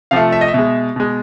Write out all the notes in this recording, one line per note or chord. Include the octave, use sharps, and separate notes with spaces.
C3 F3 A3 F5
E5
D#5
E5
B2 G#3
B2 G#3